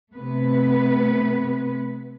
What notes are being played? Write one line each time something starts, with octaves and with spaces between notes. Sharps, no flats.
C3 A3 B3 B4